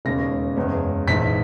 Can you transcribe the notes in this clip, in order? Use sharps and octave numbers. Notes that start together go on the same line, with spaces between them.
E1 D#2 C#3 G#3 C#4 A#6
F#1 E2 C#3 G#3 C#4
A#1 G#2 E3 G#3 B6